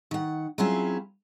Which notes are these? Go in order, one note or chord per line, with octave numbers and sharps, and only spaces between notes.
D#3 F#5
F#3 C4 C#4 E4 F4 G#4